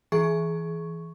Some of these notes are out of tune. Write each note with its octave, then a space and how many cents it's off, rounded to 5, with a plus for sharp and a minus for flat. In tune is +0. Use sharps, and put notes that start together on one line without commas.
E3 +0 G#4 +20 C#6 +0